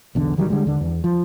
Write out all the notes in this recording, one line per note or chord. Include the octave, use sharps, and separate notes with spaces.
B1 E2 D3
D1 D#3 F#3 G3
D3 G3 G#3
D#2 D3 D4
E2
F3